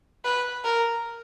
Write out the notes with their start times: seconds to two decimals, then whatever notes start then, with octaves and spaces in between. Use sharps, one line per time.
0.25 B4
0.65 A#4